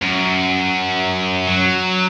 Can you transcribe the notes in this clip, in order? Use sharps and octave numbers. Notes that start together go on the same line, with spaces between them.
F#2
F#3